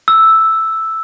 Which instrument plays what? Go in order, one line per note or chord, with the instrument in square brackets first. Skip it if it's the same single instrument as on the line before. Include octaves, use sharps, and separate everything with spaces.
[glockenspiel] E6